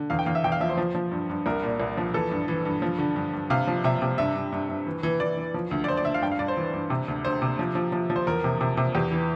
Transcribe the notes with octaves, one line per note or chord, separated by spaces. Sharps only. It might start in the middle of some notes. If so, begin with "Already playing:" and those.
Already playing: D3
E2 F5
G5
E2 F5
E5
E2 G5
F5
F3 E5
C5
F3
F3
G2
G2
C2 A#4
A#2
C2
F3
E3 A4
G2
E3
G2
F3
D3
G2
G2
C3 F5
F3
C3 E5
C3
G2 E5
G2
G2
G2
E3
E3
E3 D5
E3
F3
D2
D5
D2 C5
D5
D2 E5
F5
G2 G5
F5
G2 D5
C5
E3
G2
C3
D2
D2 C5
C3
F3
F3
F3
F3
C5
E2 A#4
C3
C3
C3
E2 G4
E3